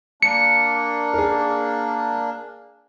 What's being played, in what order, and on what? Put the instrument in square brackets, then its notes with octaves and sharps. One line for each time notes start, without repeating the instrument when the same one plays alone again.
[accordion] A#3 D4 [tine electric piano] C#7
[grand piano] G#4 A#4